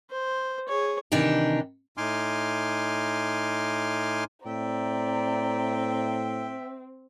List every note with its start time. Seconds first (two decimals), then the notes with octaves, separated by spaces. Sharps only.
0.10 C5
0.68 G#4 C#5
1.12 C3 D#3 E3 D4 D#4 G4
1.97 A2 D#4 G#5 C6 D6 F6
4.46 A2 C4 D5 E5 G5 A#5